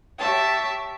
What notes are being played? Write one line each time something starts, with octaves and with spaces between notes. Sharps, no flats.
G4 C#5 E5 A5